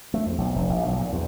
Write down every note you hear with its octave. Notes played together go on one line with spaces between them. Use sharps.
A3
F2
B1
F1
A#1
B1
A#2
E2